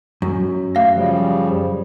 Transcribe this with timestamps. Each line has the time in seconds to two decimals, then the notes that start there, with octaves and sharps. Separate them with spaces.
0.22 F#2
0.75 A3 F5 A#6
0.93 C#3 F3 G3